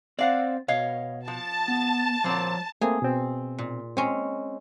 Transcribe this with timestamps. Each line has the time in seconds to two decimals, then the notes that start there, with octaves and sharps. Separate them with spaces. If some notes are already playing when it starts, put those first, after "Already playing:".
0.19 C4 D5 F5 F#5
0.68 B2 C#5 D#5 F5
1.28 F3 A5
1.68 B3
2.24 A#2 F3 C4 A#4 C#5
2.81 A3 A#3 C4 G#4
3.02 B2 C4
3.59 A#2
3.97 G#3 C4 C#4